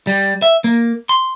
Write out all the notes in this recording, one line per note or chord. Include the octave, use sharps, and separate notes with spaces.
G3
E5
A#3
C6